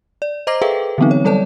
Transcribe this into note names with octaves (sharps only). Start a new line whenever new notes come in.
D5
C5 D#5 A#5 D6 A#6 C7
G#4 A4 B4 E5 F5 G5
D3 E3 F#3 B3 C4 D#4
C#5
F#3 G3 A4 C#5 D5 A5